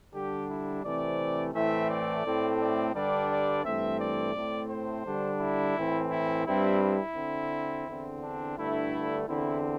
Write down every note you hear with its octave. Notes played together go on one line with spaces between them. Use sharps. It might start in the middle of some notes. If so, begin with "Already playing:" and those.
D3 G3 D4 G4
E4
C3 E3 A3 C4 D5
A2 E3 A3 C4 E5
D5
A2 A3 C4
D5
G2 D3 G3 D4 D5
D5
G2 E3 A3 C4 E5
D5
A2 A3 C4
C5
D3 G3 D4
E4
A2 E3 C4
E4
G2 G3 C4 E4
E4
D3 C4
E2 D3 C4
D4
G2 D3 A3 D4 E4
E2 D3 C4 E4